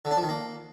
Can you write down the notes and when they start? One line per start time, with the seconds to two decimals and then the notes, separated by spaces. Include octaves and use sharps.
0.05 D3
0.11 D4
0.17 F3
0.23 D#3
0.29 A#3